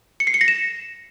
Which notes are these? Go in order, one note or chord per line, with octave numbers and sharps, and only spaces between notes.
C#7
C7
C#7
A#6
E7